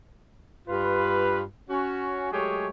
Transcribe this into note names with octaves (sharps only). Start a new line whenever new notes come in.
G2 F4 B4
C#4 F#4
F#3 G#3 A3 G4 G#4 C#5